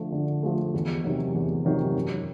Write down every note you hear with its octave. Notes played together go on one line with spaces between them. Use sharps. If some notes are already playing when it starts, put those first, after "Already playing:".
Already playing: D3 F3 A3
D3
F3 A3
E2
C3 D#3 F#3
E2
C3 D#3 F#3
F#2